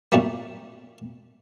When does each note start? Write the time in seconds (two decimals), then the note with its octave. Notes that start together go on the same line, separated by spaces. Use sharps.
0.12 F#2 A#2 F#3 G3 A3 A#3